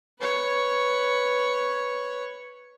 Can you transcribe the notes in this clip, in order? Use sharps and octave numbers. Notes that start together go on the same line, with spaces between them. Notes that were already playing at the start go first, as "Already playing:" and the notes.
B4 C#5